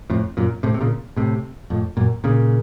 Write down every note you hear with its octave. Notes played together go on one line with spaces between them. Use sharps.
F2 A2
F#2 A#2
A2 C3
C3
A#2 C#3
A2 C3
F2 A2
F#2 A#2
A#2 C#3